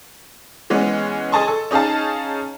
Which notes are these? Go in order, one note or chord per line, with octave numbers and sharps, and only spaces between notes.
E3 G#3 B3 C#4
G#4 D#5 G#5 A5 C6 C#6
A4
C#4 D#4 G#4 F5 A5